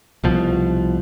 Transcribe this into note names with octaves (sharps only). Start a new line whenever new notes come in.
C2 B2 F3